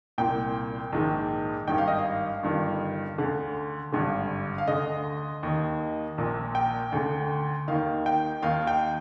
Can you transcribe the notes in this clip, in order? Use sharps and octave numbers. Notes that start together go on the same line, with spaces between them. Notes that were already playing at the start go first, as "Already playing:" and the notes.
C2 A#2 G5
A#1 G#2 D#3
G#1 G2 D#3 G5
F5
D#5
F5
G1 G2 D#3
D2 D3
G#1 G2 D3
F5
D2 D3 D#5
D#2 D#3
A#1 A#2
G5
D2 D3
D#2 D#3 F5
G5
D#2 D#3 F5
G5